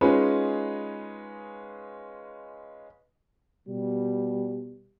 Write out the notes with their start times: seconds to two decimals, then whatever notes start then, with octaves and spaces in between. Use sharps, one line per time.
0.01 G#3 C#4 D#4 F4 G#4 B4
3.68 B2 G3